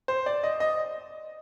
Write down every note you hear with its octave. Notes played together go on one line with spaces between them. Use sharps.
C5
D5
D#5
D#5